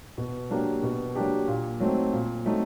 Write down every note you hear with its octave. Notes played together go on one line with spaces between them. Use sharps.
B2
F#3 A#3 D4 G4
B2
F#3 A#3 D4 G4
A#2
F#3 A3 C4 D#4
A#2
F#3 A3 C4 D#4